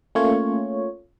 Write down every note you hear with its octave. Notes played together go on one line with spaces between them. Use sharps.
A3 A#3 C#4 F4 C#5